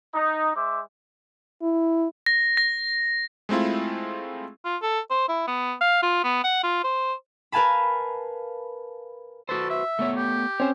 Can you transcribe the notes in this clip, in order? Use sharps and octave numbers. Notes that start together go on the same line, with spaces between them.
D#4
G#3 C5 E5 D6
E4
A#6
A#6
G#3 A3 C4 E4 F4
F4
A4
C5
E4
B3
F5
F4
B3
F#5
F4
C5
A#4 B4 F5 G#5 A5 B5
F#4 A4 B4 C5
E5
A3 B3 C#5
G4
C4 C#4 C5 C#5